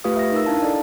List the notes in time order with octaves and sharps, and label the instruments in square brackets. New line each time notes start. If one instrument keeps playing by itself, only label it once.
[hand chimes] A3 F4 G4 B4 F5 D#6
E5 A#6
D#4 A#4 E6
D4 E4 F5 A5
A4 D5 D#5